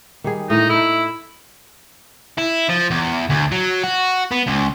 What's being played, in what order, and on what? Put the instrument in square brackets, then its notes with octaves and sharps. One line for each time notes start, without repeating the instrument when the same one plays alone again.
[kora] D#3 G3 G#4
[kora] A2 [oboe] D#4
[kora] A2 D#4 [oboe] E4
[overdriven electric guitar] E4
F3
E2
D2
F#3
F#4
B3
C#2